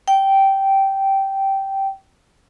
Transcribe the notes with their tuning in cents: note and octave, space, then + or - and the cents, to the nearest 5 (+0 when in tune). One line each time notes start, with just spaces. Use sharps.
G5 -10